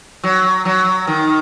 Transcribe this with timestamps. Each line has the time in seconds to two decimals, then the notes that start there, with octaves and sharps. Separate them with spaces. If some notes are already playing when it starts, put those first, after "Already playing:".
0.24 F#3
0.65 F#3
1.07 D#3